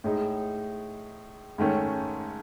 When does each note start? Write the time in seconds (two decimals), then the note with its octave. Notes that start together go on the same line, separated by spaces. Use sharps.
0.04 A2 G#3 D#4
1.58 G#2 D#3 A3 C#4